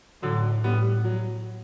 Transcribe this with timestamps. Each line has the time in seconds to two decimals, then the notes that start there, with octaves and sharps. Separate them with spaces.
0.22 A2 D3 F#3
0.64 A2 G3 B3
1.04 F#3